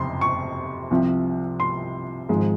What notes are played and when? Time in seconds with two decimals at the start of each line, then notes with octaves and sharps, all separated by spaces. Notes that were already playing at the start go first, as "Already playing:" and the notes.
Already playing: F#1 F2 C3 C6
0.21 C#6
0.91 C2 C3 F3
1.60 C6
2.29 G#1 G#2 F3 G#3